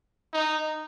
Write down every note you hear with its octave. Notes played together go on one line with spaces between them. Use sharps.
D#4